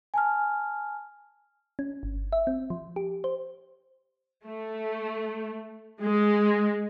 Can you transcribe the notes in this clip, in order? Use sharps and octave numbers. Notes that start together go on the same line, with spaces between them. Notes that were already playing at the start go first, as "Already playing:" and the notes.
G#5 A5 F6
C#4
G1
E5
C4
F3
G4
C5
A3
G#3